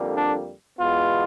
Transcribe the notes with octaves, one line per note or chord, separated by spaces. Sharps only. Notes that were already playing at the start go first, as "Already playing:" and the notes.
Already playing: F2 D3 G3 A#3
D4
E2 B2 G#3 B3 F4